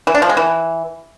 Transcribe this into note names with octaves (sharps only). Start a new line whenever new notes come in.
E3
D4
F3
G#3
E3